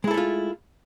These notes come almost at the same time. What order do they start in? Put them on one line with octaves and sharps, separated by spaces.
G#3 E4 A4 A3 F4